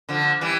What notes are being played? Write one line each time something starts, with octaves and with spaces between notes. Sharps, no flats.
D3 F3
E3 G3